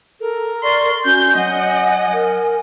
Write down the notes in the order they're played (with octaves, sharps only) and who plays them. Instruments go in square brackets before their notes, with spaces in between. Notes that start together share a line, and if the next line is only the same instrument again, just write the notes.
[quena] A4 [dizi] A#4
[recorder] D5 [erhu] C6 [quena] C#6
[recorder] C#4 [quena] F#4 [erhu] G6
[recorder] F#3 [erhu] D#5 [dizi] F#5 [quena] G#5
[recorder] A#4